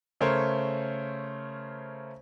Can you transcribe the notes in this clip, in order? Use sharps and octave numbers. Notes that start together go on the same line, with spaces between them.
C#3 A3 A#4 C5 C#5